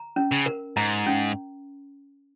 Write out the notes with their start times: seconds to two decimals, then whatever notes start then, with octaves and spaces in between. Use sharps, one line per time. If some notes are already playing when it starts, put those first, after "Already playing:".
Already playing: A#5
0.16 C#4
0.32 C#3
0.46 A#4
0.77 G#2 A#5
1.06 C#4